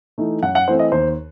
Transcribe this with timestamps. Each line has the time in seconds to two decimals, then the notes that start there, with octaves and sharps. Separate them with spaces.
0.18 E3 A3 D#4
0.42 F#2 F#5
0.55 F#5
0.68 E3 A3 C4 C5
0.79 D#5
0.92 D#2 C5